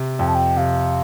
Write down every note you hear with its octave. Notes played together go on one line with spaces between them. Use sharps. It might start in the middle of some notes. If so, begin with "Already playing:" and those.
Already playing: C3
F2 G5
A5
G5
C3 F5